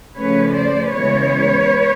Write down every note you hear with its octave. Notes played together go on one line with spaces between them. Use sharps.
C#3 F3 A3 C#4 B4 C#5
C5 D5
C#3 E3 G#3 B3 B4 C#5